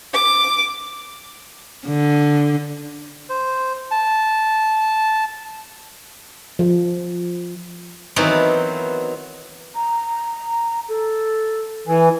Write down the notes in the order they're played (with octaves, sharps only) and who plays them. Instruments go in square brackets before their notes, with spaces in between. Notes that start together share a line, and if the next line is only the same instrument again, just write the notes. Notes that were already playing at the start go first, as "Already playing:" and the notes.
[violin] D6
[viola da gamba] D3
[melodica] C5
A5
[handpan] F3
[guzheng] D#3 E3 F#3 B3 C4
[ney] A#5
A4
[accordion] E3 [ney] G#5